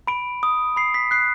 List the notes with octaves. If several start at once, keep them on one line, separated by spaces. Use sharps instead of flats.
B5 D7
D#6
B5 C7
B6
F#6 C7